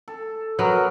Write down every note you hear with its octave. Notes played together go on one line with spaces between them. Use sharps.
A4
F#3 B3 A#4